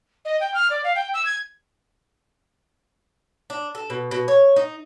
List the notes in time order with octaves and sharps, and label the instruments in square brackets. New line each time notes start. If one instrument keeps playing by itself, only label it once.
[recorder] D#5
G5
F6
D5
F5
G5
E6
G#6
[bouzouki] D4
A4
B2
B2
C#5
D#4